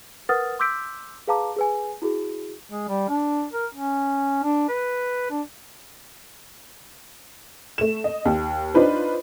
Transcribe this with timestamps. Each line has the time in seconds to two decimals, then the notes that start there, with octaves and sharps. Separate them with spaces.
0.29 A#4 B4 F#5 D#6 F6 A6
0.59 C6 D6 E6 G6 B6 D7
1.27 G#4 B4 F5 A5 A#5 D6
1.56 G#4 B4 G#5
2.02 E4 F#4 G#4
2.70 G#3
2.89 G3
3.09 D4
3.53 A#4
3.74 C#4
4.43 D4
4.69 B4
5.31 D4
7.78 A3 E7
8.04 D#5
8.25 D#2
8.74 D4 D#4 F4 B4 C5